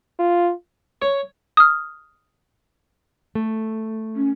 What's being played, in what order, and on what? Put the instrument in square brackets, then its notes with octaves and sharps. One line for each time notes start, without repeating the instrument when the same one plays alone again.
[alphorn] F4
[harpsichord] C#5
[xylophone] D#6 F6
[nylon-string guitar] A3
[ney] C#4